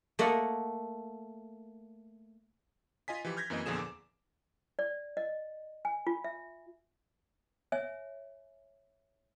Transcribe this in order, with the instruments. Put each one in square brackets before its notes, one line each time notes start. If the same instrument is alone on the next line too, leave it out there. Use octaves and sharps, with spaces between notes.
[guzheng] A3 A#3 D#5 F#5
[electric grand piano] F4 D#5 G#5 B6
E3 F3 G4
F6 G6 G#6 A#6 B6
F#2 E3 A#3 C4 D#5
E2 A#2 D3 F3 G#4 E7
D6
[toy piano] D5
D#5
G#5
F4
E5
C#5 E5 G#5